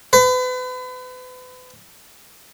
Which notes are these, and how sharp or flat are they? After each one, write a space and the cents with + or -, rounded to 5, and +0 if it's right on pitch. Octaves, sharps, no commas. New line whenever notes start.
B4 +35